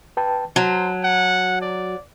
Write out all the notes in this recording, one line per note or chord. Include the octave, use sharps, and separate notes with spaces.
B4 G5 A5
F#3 C5 A5
F#5
D5